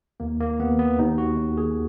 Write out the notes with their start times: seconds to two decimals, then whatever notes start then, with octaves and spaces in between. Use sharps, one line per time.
0.20 D#2 A#3
0.40 A#3
0.59 D#2 B3
0.79 B3
0.99 D#2 D#4
1.18 F#4
1.38 D#2
1.57 G#4